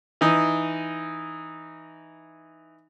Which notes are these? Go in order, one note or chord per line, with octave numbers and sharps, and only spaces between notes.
E3 D#4